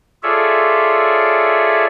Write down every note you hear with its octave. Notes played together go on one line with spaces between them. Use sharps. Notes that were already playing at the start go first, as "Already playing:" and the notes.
F4 G#4 A4 C#5 D5 E5